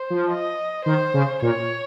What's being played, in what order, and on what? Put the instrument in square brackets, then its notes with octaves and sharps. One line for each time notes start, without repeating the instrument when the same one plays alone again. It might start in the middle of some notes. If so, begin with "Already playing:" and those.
Already playing: [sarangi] C5
[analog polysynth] F3
[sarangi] D#5
[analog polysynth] D#3 [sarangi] C5
[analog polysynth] C#3
[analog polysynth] A#2 [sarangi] C#5